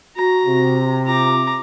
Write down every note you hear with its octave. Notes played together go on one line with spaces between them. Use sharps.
F#4 A#5
C3
F4 A#5 D6